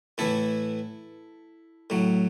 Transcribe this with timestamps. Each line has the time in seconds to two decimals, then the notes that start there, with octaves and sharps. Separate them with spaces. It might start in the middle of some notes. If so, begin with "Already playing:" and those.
0.18 A2 E3 E4 A4
1.90 A2 F#3